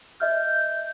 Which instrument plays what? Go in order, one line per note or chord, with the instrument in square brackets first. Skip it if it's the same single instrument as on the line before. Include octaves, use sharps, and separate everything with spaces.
[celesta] D#5 E5 F6 [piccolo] G6